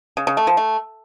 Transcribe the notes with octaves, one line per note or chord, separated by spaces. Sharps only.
C#3
C#3
A3
F3
A3